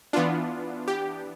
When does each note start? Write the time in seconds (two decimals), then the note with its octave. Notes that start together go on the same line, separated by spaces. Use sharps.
0.13 E3 B3 D4 F4
0.88 G4